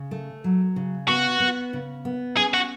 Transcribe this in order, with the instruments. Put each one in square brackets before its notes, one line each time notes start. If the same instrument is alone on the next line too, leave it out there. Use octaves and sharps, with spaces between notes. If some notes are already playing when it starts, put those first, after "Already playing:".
Already playing: [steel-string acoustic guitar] C#3
A3
F#3
C#3
[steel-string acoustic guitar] B3 [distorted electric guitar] F#4
[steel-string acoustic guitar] B3
C#3
B3
[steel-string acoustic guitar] C#4 [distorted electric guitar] G#4
[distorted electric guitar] F#4